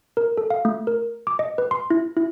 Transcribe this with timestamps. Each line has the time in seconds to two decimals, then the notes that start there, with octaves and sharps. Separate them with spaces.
0.17 A#4
0.37 A4
0.50 F5
0.65 A3
0.87 A#4
1.27 D6
1.39 D#5
1.58 B4
1.71 C6
1.90 E4
2.17 E4